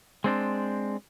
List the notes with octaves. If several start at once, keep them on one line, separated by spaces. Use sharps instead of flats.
G#3 C4 D4